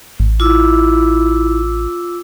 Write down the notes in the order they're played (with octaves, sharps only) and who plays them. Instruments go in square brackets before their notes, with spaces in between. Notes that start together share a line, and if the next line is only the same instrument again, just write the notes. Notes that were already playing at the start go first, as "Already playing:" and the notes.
[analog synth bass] A1
[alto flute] E4 [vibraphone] F4 D6 E6